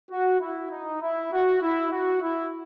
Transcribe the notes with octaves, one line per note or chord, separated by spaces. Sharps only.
F#4
E4
D#4
E4
F#4
E4
F#4
E4